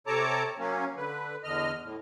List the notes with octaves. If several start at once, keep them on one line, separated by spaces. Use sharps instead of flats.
C3 A4 C#5 A5 A#5 D6
F#3 A#3 C#4
D3 B4
E2 D3 D#5 F6
A2